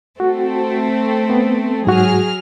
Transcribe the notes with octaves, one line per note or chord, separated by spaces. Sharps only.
A3 C4 F#4 A4
B3
G#2 F#3 F#4 G#4 F6